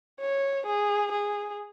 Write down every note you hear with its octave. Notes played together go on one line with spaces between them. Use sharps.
C#5
G#4
G#4